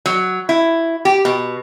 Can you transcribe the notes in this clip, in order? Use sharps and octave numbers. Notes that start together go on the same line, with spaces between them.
F#3
E4
G4
B2